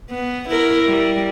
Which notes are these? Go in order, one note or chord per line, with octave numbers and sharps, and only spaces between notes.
B3
E4 A#4
G3